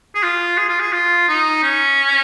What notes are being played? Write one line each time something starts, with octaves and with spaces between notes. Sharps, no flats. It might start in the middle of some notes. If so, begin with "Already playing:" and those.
G#4
F4
G#4
F4
G#4
F4
D#4
C#4